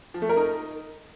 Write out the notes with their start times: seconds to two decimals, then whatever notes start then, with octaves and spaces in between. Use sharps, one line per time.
0.14 F3
0.22 A3
0.29 A#4
0.37 D#4